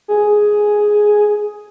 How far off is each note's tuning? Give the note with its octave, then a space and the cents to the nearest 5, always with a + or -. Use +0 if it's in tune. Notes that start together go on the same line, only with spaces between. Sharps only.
G#4 +5